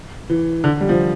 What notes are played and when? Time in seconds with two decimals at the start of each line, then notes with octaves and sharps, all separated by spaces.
0.30 E3
0.64 D3
0.81 G3
0.89 F3